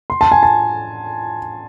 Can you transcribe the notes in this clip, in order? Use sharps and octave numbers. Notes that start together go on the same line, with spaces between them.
C6
A5
G#5
A5